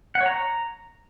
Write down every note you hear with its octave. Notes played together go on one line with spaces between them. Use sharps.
F#5
C#5
A#5